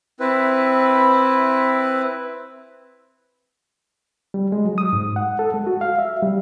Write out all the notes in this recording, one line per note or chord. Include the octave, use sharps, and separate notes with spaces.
C4 E4 B4
G3
G#3
F#3
D#6
G#2
F#5
A4
G#3
F#4
F5
E5
G3